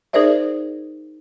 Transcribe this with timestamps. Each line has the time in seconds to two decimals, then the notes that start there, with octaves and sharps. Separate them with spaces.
0.13 D#4 G#4 A#4 C5 D5 E5